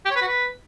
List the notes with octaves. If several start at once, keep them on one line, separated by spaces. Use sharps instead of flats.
G4
C#5
B4
F#4
B4